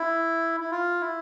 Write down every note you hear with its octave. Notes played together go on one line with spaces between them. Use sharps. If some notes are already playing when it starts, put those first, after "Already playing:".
Already playing: E4
E4
F4
E4